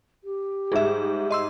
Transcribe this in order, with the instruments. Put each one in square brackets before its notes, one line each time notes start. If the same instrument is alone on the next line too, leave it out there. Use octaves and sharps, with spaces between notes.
[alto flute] G4
[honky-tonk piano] G#2 G3 [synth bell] G#4 E5
[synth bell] D#5 C6 E6